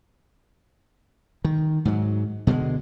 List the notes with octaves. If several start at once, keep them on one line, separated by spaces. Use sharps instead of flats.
D#3
G#2 F#3
B2 D3 F3 G#3